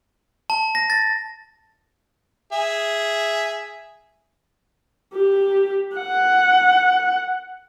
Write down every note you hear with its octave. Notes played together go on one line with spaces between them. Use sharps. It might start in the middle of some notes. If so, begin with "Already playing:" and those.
A5
A#6
A6
G#4 E5
G4
F#5